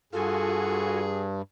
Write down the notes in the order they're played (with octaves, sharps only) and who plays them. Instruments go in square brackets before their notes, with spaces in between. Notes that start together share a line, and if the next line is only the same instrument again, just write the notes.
[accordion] G2 [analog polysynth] F4 F#4 G#5 [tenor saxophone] G#4 [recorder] A4